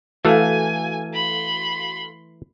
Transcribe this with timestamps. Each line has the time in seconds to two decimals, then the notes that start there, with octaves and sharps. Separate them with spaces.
0.25 E3 A3 F#4 A4 F5 G#5
1.14 B5 C6